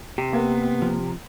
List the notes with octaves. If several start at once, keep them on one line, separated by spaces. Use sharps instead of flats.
C3 G4
A#3 B3
F3